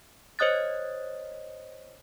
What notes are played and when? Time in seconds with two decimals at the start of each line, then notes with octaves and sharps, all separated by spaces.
0.39 C5 C#5 D#5 D#6 F#6 A6